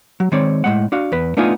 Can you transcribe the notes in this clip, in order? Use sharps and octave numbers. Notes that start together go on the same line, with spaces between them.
F#3
D#3 G#3 C4 C#5 D5
A2 G#3 F#5
D4 F#4 F5
E2 B4
A3 B3 D4 D#4 F4 G#5